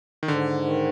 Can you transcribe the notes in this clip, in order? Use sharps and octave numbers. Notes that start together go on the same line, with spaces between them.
D#3
G#2 D3
D#3